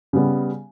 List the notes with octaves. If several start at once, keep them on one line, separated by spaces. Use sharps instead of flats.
C#3 G3 B3